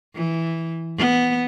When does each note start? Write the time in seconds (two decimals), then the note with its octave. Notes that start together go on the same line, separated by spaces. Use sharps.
0.15 E3
0.97 B3